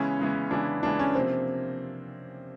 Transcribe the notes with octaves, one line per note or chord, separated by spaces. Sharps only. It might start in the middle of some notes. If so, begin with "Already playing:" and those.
Already playing: C#3 E3 G#3 B3 C#4 E4
C#3 E3 G#3 B3 E4
C#3 E3 G#3 B3 D4 E4
C#3 E3 G#3 B3 D4 E4
C#4
C3 F3 A#3 C4